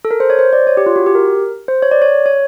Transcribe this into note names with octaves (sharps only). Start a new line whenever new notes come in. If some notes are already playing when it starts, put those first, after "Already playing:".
A4
A#4
C5
C#5
C5
D5
C#5
G4
F4
F#4
G4
A#4
C5
C#5
D5
C#5
C#5